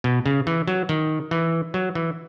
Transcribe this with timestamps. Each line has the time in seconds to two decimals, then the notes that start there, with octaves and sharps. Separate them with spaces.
0.04 B2
0.26 C#3
0.47 E3
0.68 F#3
0.89 D#3
1.31 E3
1.74 F#3
1.95 E3